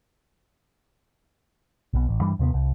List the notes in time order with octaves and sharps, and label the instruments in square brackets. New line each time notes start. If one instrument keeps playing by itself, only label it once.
[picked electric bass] B1 B2
A1
G2 E3 G3 D4
D#2 C3 G3 B3
C2